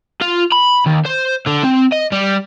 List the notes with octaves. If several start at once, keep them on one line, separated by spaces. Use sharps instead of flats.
F4
B5
D#2
C5
D3
C4
D#5
G3